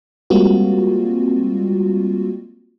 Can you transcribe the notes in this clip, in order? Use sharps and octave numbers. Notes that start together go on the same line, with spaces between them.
G3 G#3 A#3 C4 F4 F#4